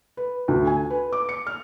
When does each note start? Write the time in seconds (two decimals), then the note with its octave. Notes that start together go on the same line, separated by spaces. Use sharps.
0.17 B4
0.48 D2
0.67 G#5
0.90 B4
1.13 D6
1.29 C#7
1.47 F6